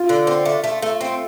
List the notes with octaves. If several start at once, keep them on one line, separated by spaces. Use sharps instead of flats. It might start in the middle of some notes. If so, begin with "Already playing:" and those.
Already playing: F4
D3
C4
A3
A3
A3
C4